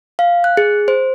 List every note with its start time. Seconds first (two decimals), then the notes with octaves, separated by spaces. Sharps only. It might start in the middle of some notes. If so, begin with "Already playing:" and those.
0.19 F5
0.44 F#6
0.57 G#4
0.88 C5